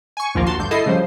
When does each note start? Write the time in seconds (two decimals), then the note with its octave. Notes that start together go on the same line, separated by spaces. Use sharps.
0.17 G#5 C#6
0.35 A#1 D#2 F3 A#3 F4
0.47 F#4 A5 C6
0.59 G2 D3 G6
0.71 E4 A4 D#5 C7
0.86 C#3 F3 G3 C5